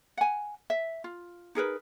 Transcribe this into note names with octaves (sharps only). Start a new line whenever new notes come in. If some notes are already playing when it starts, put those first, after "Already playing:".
F#5 G#5
E5
F4
D#4 G#4 A#4 B4